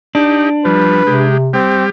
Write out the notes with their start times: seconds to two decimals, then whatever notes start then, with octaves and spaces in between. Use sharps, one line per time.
0.15 D4 D#4 G4
0.65 F3 G3 B4
1.07 C3 G#3 G4
1.54 G3 C4 G4